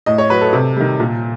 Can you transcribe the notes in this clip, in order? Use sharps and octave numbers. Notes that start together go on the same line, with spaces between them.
A2 D#5
C#5
F#3 B4
A4
C3
D#3 G3
A#2